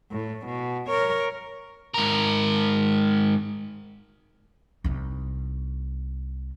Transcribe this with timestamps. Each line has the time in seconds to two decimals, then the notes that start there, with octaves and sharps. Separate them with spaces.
0.11 A2
0.46 B2
0.88 A#4 C#5
1.94 G#2 A#4
4.84 C2 D#4